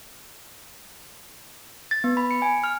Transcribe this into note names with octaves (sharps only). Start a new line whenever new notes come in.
A6
B3
B5
C#7
G#5
F6